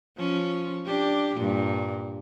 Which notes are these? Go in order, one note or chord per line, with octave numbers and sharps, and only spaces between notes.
F3 C#4
D4 G4
G2 A#2